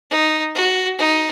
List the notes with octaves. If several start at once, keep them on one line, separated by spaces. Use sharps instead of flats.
D#4
F#4
D#4